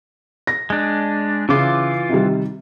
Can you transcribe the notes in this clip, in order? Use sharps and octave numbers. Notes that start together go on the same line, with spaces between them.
A#6
G#3 D4
C#3 E3 F4 D6
C3 D#3 G3